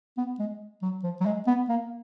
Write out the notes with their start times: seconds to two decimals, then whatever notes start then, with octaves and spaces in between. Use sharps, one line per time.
0.17 B3
0.39 G#3
0.82 F#3
1.03 F3
1.20 F#3
1.25 G#3
1.47 B3
1.69 A#3